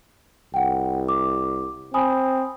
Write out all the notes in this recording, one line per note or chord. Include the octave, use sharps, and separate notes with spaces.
C2 F#5 G5
D6
C4 G#5 B5 D#6